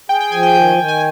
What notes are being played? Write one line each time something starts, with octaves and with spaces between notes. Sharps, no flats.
G#4 G5
G5
F3 G#5
G5
D#3 G5
G5
D#3
G#5